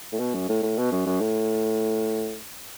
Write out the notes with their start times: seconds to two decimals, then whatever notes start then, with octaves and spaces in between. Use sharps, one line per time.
0.12 A2
0.19 B2
0.34 F#2
0.49 A2
0.63 A2
0.78 B2
0.92 F#2
1.06 F#2
1.20 A2